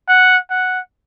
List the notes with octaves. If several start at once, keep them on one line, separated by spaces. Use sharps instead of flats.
F#5
F#5